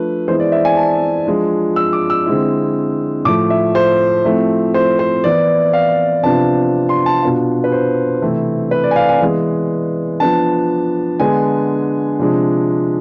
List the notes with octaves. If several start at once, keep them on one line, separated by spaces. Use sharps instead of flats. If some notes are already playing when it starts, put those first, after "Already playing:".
Already playing: F3 A3 D4 B4
E3 G#3 B3 E4 C5
D5
E5
G#5
A5
F3 G#3 D4 F4
E6
D6
E6
D3 G#3 C4 E4
A2 F3 A3 D6
E5
C5
F3 A3 C4 E4
C5
C5
E3 B3 E4 D5
F5
C3 F3 B3 D4 F4 A5
C6
A5
B2 B3 D4 F4
B4
C5
C3 E3 A3 C4 E4
B4
D5
G#5
F5
G#5
E3 G#3 B3
F3 B3 D4 A5
D3 G#3 B3 D4 G#5
C3 F3 G#3 D4